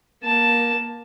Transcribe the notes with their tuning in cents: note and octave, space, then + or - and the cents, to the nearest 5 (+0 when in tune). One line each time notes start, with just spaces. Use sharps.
A#3 +20 A5 +0